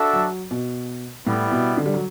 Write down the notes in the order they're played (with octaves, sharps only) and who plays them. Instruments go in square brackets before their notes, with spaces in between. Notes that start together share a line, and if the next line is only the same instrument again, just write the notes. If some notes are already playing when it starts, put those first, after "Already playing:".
Already playing: [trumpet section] D4 F#4 A4 E5
[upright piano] F#3
B2
[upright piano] A2 [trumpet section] G3 B3 E4
[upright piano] B2
D3
G3
F#3